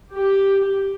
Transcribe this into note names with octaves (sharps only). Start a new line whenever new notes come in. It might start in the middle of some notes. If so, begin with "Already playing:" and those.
G4